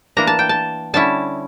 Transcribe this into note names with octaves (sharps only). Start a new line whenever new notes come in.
E3 A#3 D4 A#5
A5
G5
A5
D3 G3 C#4 E4 A5